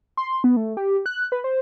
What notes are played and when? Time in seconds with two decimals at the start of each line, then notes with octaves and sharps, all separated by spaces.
0.17 C6
0.44 B3
0.57 A3
0.77 G4
1.06 F#6
1.32 B4
1.44 C5